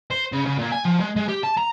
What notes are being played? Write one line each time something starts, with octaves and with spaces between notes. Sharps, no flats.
C5
C#3
C#3
A#2
G#5
F3
G#3
G#3
G4
A5
A#5